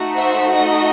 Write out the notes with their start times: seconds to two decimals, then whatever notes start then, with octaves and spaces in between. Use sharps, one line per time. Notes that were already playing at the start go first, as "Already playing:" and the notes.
Already playing: A3 D#4 F#4
0.16 C5 E5
0.53 D#5